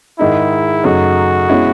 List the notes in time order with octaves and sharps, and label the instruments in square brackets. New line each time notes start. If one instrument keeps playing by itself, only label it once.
[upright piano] G#2 D#3 G#3 D#4 [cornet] E4
[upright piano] F#2 C#3 F#3 A3 D#4 [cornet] F#4
[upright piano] B2 G#3 C#4 E4